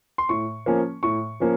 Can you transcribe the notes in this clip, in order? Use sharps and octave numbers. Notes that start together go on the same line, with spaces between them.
C6
A2 C#6
F3 A#3 C#4
A2 C#6
F3 A#3 C#4